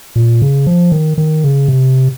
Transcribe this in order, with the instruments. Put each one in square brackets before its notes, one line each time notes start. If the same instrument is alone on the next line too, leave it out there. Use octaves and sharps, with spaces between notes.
[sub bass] A#2
C#3
F3
D#3
D#3
C#3
C3